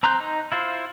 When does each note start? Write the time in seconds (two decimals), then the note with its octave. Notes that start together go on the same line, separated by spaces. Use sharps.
0.03 C4 A#5 C6 F#6 G6
0.20 D#4
0.52 E4 F4 C5